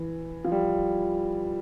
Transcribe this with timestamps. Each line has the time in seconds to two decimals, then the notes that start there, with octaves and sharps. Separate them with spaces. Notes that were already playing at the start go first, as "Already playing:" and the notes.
Already playing: E3
0.45 F3
0.52 G3